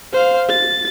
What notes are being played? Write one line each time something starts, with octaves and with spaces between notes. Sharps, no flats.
C5 F5
A6